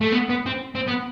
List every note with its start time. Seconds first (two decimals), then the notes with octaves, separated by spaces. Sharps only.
0.01 A3
0.12 B3
0.30 B3
0.46 C4
0.75 C4
0.88 B3